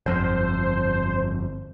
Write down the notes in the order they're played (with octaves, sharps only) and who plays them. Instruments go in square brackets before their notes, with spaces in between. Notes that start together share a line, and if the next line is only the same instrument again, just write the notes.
[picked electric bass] G1 F2 [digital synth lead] C5